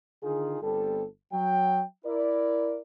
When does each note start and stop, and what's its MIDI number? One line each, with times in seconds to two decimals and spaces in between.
0.22 0.60 50
0.22 0.60 51
0.22 0.60 63
0.22 0.60 65
0.22 0.60 68
0.62 1.04 31
0.62 1.04 55
0.62 1.04 59
0.62 1.04 60
0.62 1.04 67
0.62 1.04 69
1.32 1.82 54
1.32 1.82 79
2.05 2.79 64
2.05 2.79 70
2.05 2.79 74